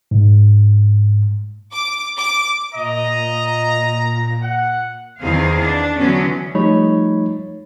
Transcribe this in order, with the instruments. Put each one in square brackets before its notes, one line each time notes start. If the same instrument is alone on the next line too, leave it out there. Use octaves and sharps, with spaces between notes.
[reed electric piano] G#2
[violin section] D6
D6
[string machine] A#2 [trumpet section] D#5 [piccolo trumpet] A#5
[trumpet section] F#5
[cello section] E2 D#3 C4 G#4 F5
D4
D3 E3 F#3 B3 C#4
[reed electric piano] F3 G3 A3 D#4 C#5 B5